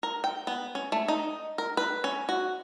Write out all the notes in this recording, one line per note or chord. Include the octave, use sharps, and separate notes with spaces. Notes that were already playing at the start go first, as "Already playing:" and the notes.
A#4
G5
B3
C#4
A3
D#4
A#4
B4
C#4
F#4